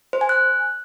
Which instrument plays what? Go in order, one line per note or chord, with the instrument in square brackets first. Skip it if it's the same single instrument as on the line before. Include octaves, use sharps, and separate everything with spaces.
[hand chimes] C5
G#5
F#6